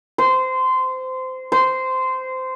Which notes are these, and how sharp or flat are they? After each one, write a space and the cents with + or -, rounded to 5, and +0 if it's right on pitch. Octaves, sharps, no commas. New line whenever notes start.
C5 -20
C5 -15